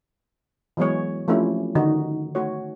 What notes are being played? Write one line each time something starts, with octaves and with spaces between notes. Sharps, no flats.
E3 F#3 G#3 B3 G#4 C#5
F3 A3 C4 C#4 E4 G4
D3 D#3 D#4 F#4
A3 F#4 C#5